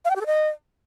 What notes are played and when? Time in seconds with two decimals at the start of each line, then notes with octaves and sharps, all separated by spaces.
0.05 F5
0.10 G5
0.16 G4
0.21 A4
0.26 D#5